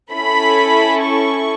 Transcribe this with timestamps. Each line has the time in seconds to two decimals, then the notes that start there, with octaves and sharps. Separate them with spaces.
0.12 C#4 E4 A4 B5
1.04 C#6